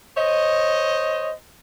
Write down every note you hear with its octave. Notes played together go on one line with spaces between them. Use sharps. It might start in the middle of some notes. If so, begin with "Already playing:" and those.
C5 C#5 D#5